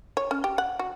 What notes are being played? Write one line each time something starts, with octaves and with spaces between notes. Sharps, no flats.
C#5
C#4
G4
F#5
F#4